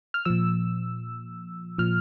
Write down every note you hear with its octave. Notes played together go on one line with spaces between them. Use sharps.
F6
A#2 F3 E6
A#2 F3 F6